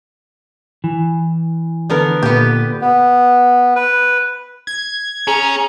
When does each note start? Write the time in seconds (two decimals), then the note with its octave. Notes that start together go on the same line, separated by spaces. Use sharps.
0.84 E3
1.90 D3 B3 A#4
2.22 A#2 B3 G4
2.81 B3
3.76 B4
4.67 G#6
5.27 C#4 G#4 A#5